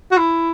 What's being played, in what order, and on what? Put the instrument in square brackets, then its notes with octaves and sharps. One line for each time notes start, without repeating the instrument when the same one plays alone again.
[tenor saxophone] F#4
E4